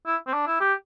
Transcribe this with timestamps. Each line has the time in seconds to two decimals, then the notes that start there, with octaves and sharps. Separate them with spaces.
0.06 E4
0.27 C4
0.34 D4
0.47 E4
0.61 G4